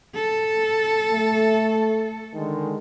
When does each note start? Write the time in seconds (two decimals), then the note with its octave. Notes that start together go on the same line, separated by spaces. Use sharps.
0.15 A4
1.12 A3
2.34 D3 D#3 G#3